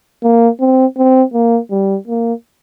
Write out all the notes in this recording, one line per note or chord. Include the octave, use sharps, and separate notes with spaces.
A#3
C4
C4
A#3
G3
A#3